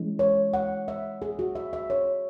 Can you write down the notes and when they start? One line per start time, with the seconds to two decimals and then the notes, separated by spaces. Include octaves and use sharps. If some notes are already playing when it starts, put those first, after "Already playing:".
Already playing: E3 G#3 C#4 E4
0.19 C#5
0.54 F#5
0.88 E5
1.22 G#4
1.39 F#4
1.55 E5
1.73 E5
1.90 C#5